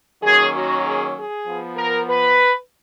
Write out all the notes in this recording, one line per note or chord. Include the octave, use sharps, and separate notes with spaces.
D#3 F#3 A#3 C#4 G#4
F#4
G#4
G#4
F3 B3
A#4
B4